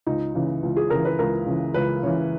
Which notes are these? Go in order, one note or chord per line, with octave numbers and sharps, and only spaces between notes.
C#2 D#4
C#3 E3
C#2
G#4
C#3 E3 A#4
B4
C#2 A#4
C#3 E3
C#2 B4
C#3 E3 C#5